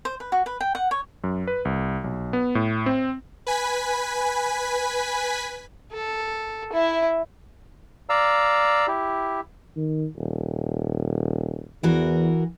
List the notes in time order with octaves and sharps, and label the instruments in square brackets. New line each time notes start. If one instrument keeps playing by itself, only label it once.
[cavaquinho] C5
B4
F#4
B4
G5
F#5
C#5
[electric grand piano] F#2
B4
C2
B1
B3
A2
C4
[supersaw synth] B4 G#5 B6
[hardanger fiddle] A4
E4 E5
[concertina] D5 F5 A#5 E6
E4 G4
[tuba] D#3
D#1
[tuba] E2 [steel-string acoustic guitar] E3 F#4 A#4